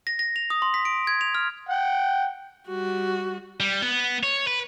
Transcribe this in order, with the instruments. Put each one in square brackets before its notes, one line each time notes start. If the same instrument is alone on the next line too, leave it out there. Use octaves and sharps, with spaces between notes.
[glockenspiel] A#6
A#6
F7
D#6
C6
B6
D7
G#6
F7
F6
[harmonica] F#5 G5
[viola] G3 F#4
[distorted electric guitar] G3
B3
C#5
B4